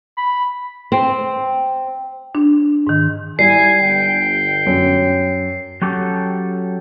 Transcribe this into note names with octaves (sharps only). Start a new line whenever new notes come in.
B5
C4
D4
G#2 D#3
G#2 G3 E4 G#5 C7
G1 G5
F#2
F#3 C#4 G4 A4